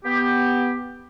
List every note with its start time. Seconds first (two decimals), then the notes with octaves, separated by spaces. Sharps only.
0.05 B3 G4